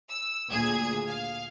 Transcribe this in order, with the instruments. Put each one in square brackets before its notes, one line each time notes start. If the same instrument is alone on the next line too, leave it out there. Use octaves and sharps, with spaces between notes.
[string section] E6
D2 A#2 G#4 G#6
F5